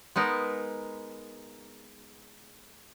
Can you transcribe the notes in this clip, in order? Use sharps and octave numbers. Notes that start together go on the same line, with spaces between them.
G#3 B3 D#4 A#4